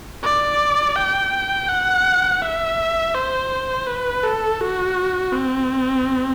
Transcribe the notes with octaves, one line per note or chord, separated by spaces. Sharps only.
D5
G5
F#5
E5
C5
B4
A4
F#4
C4